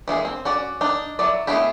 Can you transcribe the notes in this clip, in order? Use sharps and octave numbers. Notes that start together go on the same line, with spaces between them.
E3 G#3 A#3 G#4
C4
C#4 F#4 D5
D4 D#4
F#3 E4 D5
G#3 A3 B3 E4 G4